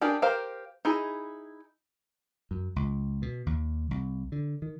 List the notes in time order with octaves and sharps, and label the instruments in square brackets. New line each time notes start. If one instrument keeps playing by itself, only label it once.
[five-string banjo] C#4 D4 G4 G#4 A#4
G4 A#4 C5 F5
D#4 E4 G#4
[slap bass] F#2
C#2
B2
D#2
C2
D3
D#3